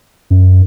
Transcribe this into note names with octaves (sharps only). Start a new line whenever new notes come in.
F#2